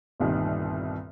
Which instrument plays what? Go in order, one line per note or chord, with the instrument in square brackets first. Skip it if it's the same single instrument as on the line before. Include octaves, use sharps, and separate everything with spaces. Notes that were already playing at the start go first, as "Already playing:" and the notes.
[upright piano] G1 C2 A#2 D#3 G3